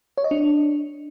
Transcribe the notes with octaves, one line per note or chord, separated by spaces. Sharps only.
C#5
D#5
D4